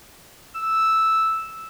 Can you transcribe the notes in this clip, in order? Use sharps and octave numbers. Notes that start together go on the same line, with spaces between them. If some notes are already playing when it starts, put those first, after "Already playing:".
E6